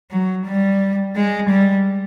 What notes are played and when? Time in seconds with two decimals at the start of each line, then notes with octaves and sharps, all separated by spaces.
0.11 F#3
0.46 G3
1.16 G#3
1.49 G3